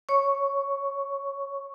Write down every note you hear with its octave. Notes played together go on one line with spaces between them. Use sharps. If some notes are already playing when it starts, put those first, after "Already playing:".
C#5 C#6